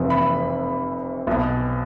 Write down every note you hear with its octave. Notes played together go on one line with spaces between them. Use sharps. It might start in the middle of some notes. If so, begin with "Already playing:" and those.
Already playing: F1 F2 C3 E3
B5
B1 B2